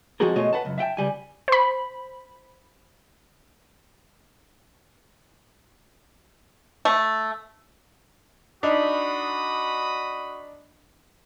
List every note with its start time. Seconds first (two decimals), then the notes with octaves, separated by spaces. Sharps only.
0.20 F3 G#3 C4 F#4 G#4 A#4
0.36 G#2 B2 G#3 A3 C#5 D#5
0.53 B4 F#5 A5
0.65 C#2 F#2
0.78 E5 F#5 G5 A5
0.97 C#2 G3 G#5
1.48 C5 B5
6.85 A3
8.63 D4 D#4 F#4 B5 D#6